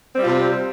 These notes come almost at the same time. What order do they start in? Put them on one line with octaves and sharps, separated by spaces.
C4 G3 F4 C3